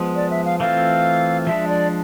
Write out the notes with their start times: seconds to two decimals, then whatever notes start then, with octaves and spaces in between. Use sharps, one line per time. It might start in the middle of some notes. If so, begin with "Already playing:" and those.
Already playing: F3 G#3 B3
0.16 D5
0.31 E5
0.45 F5
0.60 E3 A3 C4 F4 F5
1.46 F3 G#3 D4 E5
1.68 D5